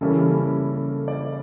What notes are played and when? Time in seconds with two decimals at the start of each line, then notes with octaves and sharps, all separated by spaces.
0.01 C#3 E3 G3 A#3 C#4 A4
0.37 A#4
0.72 A4
1.08 D5